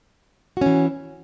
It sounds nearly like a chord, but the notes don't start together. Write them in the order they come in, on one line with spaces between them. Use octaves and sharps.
F#4 C#4 E3